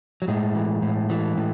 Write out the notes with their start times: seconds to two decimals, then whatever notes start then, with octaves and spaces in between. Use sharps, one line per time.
0.22 F#3
0.28 A2 G#3
0.55 E3
0.82 A2
1.10 E3
1.37 A2